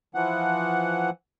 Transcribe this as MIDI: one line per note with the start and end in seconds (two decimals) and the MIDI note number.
0.15 1.10 52
0.15 1.10 53
0.15 1.10 78